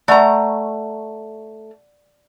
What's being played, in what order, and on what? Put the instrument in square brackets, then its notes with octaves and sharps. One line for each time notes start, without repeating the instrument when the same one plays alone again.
[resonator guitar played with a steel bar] A3 A#5 [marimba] D5 F#5